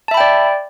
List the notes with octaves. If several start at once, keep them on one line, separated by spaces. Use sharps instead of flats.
D5 E5 G5 A5 B5